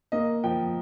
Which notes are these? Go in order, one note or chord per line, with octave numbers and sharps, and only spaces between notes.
A#3 D#5
F3 G5